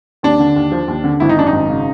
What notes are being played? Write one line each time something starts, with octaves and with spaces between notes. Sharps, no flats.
D#2 D4
D3
D#2
F3
D#2
D3
G#1 E4
D#4
F#2 D4
D#4
G#1
C#3